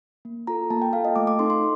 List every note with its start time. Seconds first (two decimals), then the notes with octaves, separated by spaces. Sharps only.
0.25 A#3
0.47 F4 A4 A#5
0.70 A#3 A5
0.82 G5
0.93 F4 A4 F5
1.05 D#5
1.16 A3 D6
1.27 D6
1.39 C4 D#4 A4 C6
1.50 C6